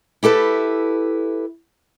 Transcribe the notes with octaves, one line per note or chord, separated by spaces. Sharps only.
E4 G4 A4 B4